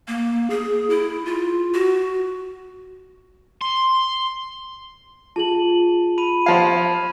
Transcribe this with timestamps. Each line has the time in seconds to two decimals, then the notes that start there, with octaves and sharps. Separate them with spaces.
0.08 A#3
0.50 G#4
0.90 E4
1.26 F4
1.74 F#4
3.61 C6
5.36 F4 G#4 A5 F#7
6.18 B5 D#7
6.46 F3 F5 C6 G#6